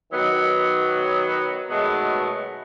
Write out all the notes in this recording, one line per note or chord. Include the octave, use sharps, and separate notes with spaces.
D#3 F#3 B3
B2 D#3 F#3 G#3 A3 B3